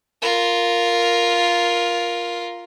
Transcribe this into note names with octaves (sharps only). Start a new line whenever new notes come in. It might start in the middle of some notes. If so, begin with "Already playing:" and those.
F4 A#4